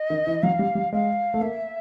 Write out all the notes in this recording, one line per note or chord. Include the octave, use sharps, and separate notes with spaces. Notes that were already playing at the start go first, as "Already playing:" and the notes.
Already playing: D#5
D#3
E3
F#3 F5
G3
G3
G#3 F5
A3
A#3 E5